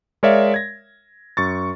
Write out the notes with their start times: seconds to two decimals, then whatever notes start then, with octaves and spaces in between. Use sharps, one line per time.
0.23 G#3 A#4 C#5 D5 E5 F5
0.54 G#6 A#6
1.37 F#2 C#6 A6